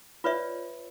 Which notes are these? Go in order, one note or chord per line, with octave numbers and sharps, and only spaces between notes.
F4 B4 C#5 D5 E5